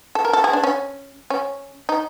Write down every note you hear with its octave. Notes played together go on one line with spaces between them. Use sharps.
A4
A#4
A4
G#4
D4
C#4
C#4
D#4